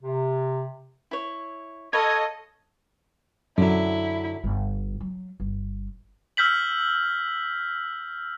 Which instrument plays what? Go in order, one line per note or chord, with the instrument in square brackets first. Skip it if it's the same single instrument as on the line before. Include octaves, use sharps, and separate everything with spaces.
[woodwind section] C3
[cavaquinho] E4 C#5
[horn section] A4 D#5 [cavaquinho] C#5 F5 B5 [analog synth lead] G#6
[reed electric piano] F#2 [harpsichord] D3 F#3 [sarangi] E4
[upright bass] G1
F#3
G1
[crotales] E6 F6 G6 B6 F#7